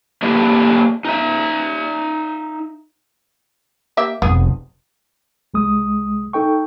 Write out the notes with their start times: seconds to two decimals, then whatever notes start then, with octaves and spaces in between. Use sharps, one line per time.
0.23 A2 A#3 D4 E4 G4 D#5
1.05 D#4 E5
3.97 A#3 G4 E5
4.22 F1 B3 G#4
5.54 C2 G#3 D#6
6.33 D#4 A4 G5 C#6